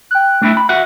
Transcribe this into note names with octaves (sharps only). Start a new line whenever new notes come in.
G5 F#6
A3 D4 E4
B5
F#4 E5 F#5